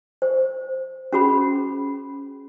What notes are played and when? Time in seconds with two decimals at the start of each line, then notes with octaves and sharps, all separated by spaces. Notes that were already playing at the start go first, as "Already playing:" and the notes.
0.22 C5
1.13 C#4 F#4 G#4 B5